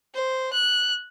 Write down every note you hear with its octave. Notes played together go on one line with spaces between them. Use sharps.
C5
F#6